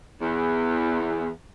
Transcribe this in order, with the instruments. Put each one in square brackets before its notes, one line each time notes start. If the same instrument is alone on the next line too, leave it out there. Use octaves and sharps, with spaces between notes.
[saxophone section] E2